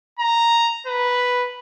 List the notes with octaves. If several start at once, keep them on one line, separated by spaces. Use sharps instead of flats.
A#5
B4